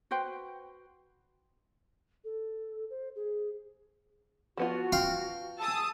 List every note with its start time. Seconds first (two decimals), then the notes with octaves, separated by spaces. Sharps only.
0.11 F#4 B4 C5 G5
2.24 A4
2.90 C5
3.16 G#4
4.57 F3 B3 F4 F#4
4.92 F5 G5 C6
5.60 G#4 A5 D#6 E6